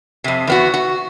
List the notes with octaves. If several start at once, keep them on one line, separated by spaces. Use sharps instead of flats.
F2 C3
E2 B3 F#4
F#4